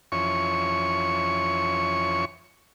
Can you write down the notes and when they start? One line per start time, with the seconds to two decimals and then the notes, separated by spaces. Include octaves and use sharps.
0.12 F2 E3 C#4 C#5 C#6